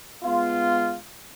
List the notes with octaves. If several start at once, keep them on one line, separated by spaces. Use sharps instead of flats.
G#3 B3 F4